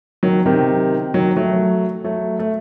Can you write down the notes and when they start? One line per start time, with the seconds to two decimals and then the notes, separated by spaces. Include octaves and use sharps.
0.23 D#3 F#3
0.46 C3 D#3
1.14 D#3 F#3
1.37 F#3 A3
2.04 F#3 A3
2.39 A3